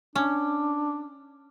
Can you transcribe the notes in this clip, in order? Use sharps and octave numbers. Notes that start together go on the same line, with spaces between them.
C#4 D4